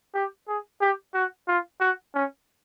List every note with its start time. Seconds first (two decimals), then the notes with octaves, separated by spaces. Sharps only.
0.14 G4
0.48 G#4
0.81 G4
1.14 F#4
1.48 F4
1.80 F#4
2.14 C#4